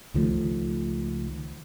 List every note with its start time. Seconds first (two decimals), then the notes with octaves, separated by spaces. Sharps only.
0.14 C#2 D#3 F3 A3